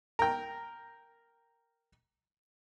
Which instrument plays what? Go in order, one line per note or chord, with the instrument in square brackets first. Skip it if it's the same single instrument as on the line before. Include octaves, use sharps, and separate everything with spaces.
[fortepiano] A#4 G5